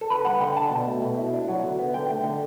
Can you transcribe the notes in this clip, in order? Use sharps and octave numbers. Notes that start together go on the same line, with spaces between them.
A4
D3 B4
G3 F#5
D3 G5
D4 A5
B2
A3
B2
E4
D4
F#3
D3
B3
D3 G5
A3
D3